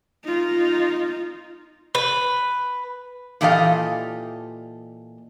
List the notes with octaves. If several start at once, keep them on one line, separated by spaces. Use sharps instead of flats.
D#4 F4
B4
A#2 E3 G4 A4 D#5 F5